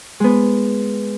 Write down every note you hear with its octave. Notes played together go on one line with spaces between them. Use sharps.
G#3 B3